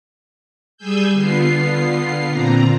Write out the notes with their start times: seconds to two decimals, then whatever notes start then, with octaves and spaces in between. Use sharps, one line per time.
0.77 G3 G#4 G#5 E6 G6
1.12 D3 B3 F4 C7
2.28 A#2 D3 C4 F4 A#5